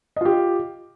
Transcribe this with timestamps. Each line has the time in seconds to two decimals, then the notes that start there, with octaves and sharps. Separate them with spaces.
0.16 D#5
0.21 F4
0.25 G4